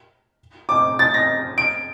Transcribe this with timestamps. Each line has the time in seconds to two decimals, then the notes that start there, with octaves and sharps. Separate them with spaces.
0.69 D6
0.99 A6
1.14 A#6
1.58 D7